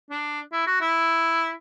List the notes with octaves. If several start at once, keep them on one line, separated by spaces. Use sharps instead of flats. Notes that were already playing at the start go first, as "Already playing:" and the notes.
D4
E4
F#4
E4